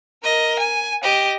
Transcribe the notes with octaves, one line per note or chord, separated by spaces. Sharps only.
A#4 D#5
G#5
G4 D#5